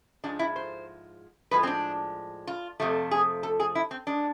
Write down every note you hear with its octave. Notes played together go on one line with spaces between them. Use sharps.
G#2 F3 G#3 D4
E4
C5
A2 F3 G#3 B4
C4
D4
F4
F2 C3 F3 A3
G#4
A4
G#4
E4
C4
G#3 D4